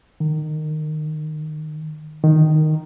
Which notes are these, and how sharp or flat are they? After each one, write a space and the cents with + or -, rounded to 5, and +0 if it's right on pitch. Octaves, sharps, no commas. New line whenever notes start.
D#3 -20
D#3 -5